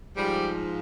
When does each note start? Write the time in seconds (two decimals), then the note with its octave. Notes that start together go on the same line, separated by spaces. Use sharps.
0.15 G#2 F3 G3